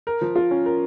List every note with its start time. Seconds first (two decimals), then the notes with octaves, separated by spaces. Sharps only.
0.07 A#4
0.21 F3
0.36 F4
0.51 C#4
0.66 A#4